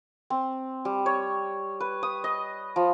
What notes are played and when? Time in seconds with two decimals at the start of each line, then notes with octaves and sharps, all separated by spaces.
0.30 C4
0.85 G3
1.06 C#5
1.80 B4
2.03 D#6
2.24 D#5
2.76 F3